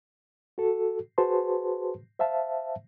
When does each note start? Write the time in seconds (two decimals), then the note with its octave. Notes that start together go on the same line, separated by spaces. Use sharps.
0.58 F#4 A4
1.18 F#4 G#4 B4 C5 A5 C6
2.19 C5 E5 F5 A5